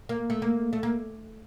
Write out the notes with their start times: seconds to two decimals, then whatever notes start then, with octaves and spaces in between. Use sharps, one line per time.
0.09 A#3
0.30 A3
0.42 A#3
0.73 A3
0.83 A#3